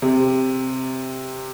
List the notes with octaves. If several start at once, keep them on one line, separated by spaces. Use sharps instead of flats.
C3